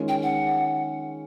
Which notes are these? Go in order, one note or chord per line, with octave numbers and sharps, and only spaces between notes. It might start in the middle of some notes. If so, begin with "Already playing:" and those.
Already playing: D#3 G#3 C#4 F4 A#4
G5
F#5